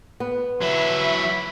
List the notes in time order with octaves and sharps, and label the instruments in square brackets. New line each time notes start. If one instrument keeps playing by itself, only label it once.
[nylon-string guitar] B3
[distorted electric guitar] F#3 E4 [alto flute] E5 [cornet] B5